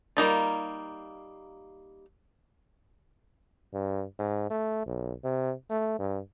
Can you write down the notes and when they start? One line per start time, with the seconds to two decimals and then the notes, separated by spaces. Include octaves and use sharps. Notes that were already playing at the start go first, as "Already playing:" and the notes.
0.17 G3 A#3 D#4 F4
3.73 G2
4.19 G#2
4.50 A3
4.86 B1
5.24 C3
5.70 A3
5.99 G2